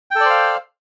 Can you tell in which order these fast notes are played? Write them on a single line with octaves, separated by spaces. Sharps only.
G5 A4 D5 C5 F5